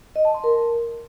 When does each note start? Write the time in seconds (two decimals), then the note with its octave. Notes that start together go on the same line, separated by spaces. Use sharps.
0.16 D#5
0.25 A5
0.34 C6
0.44 A#4